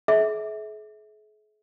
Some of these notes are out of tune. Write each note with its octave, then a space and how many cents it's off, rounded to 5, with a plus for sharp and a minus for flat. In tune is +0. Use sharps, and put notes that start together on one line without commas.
G#4 +40 E5 -25